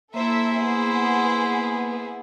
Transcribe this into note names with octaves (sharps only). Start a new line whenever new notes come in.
A#3 E4 A4 C5 E5
B3 G#4